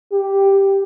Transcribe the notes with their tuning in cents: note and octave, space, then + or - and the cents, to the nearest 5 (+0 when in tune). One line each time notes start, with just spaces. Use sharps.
G4 +0